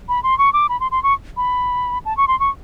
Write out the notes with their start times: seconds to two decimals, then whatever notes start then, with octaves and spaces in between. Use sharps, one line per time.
0.09 B5
0.23 C6
0.39 C#6
0.53 D6
0.69 B5
0.80 C6
0.91 C6
1.03 C#6
1.37 B5
2.05 A5
2.17 C#6
2.28 C6
2.40 C#6